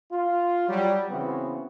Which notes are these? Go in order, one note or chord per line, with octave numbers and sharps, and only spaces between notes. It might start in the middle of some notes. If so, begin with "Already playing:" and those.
F4
F#3 G3
C#3 E3 B3 C4 F#4